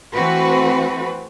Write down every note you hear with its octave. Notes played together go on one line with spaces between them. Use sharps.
E3 A3 C4 F#4 B4